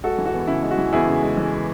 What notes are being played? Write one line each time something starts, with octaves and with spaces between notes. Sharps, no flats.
G#3 F#4 A4
E3
F#4
E2
C#3 E4
G#3
F#4
E3
E2 E4 G#4
C#3
G#3
E3